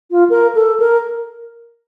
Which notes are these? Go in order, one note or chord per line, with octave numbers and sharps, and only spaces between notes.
F4
A#4
A4
A#4